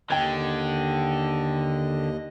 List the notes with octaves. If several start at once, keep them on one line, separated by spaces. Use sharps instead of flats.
D#2 D3 D#5 G5 G#6